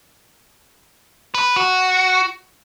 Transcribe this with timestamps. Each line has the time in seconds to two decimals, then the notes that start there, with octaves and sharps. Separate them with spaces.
1.35 B4
1.56 F#4